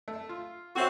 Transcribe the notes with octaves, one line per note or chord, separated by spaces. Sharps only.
A3
F4
C4 F#4 A4 C#5 E5